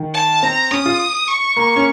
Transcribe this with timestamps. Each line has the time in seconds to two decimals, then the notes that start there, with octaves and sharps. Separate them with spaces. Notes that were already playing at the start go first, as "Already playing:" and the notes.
Already playing: D#3
0.14 A5
0.43 C4 A#5
0.71 C#4 D#6
0.86 F4
1.28 C#6
1.56 A#3
1.76 C#4